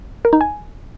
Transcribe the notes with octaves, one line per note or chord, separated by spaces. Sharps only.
A#4
D#4
G#5